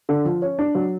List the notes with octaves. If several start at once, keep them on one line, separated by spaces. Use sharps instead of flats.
D3
F3
C#4
D4
F#3